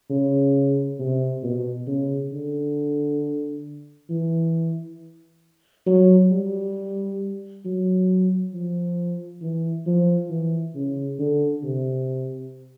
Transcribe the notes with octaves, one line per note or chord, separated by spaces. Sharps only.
C#3
C3
B2
C#3
D3
E3
F#3
G3
F#3
F3
E3
F3
E3
C#3
D3
C3